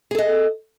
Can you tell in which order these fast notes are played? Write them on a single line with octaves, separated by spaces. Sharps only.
G#4 A4 D#5